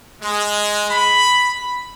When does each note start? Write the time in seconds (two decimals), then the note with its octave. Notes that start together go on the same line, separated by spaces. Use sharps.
0.22 G#3
0.90 B5